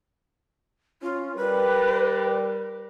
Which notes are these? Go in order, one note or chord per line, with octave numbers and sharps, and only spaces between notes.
C#4 F4
G3 A#4 B4